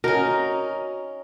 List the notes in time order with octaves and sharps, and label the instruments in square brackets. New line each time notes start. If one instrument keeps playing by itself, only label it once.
[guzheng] C#4 D#4 [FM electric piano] F#4 [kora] A#4